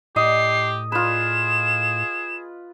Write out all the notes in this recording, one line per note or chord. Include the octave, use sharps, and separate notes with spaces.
A2 G4 D#5 C7
F4 G#4 B4 E7